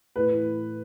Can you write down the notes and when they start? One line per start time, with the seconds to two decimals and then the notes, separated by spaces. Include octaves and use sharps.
0.16 A2 B4
0.31 E3